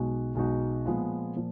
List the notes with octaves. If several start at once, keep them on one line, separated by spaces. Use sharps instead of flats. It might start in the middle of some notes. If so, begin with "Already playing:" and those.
Already playing: B1 B2 G#3 D#4 F#4
B1 B2 G#3 D#4 F#4
A#2 F3 G#3 B3 F4
A#2 F3